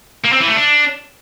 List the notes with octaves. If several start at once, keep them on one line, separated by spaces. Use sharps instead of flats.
A#3
C4
E3
A3
D4